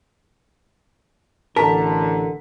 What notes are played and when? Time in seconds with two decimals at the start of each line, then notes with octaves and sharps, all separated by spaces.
1.56 A1 D3 A#4 A5 B6